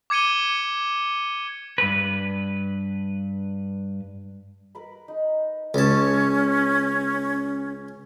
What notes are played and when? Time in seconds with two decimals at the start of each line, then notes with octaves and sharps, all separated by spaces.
0.10 D6 G#6 C#7 D#7 G7
1.78 G2 B4
4.75 A#4 B4 B5
5.08 D#4 D#5
5.74 C#2 C#4 A5